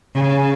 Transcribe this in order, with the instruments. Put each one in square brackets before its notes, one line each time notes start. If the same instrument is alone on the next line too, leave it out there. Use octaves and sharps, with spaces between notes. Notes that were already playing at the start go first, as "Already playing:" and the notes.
[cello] C#3